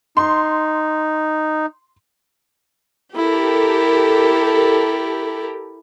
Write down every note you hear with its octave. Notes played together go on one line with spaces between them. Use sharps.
D#4 C6
E4 G4 A4 A#4